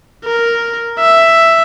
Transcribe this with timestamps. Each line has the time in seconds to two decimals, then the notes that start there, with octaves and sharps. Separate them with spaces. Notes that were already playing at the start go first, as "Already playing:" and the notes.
0.25 A#4
0.99 E5